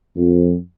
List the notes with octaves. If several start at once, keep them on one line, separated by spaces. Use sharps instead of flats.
F2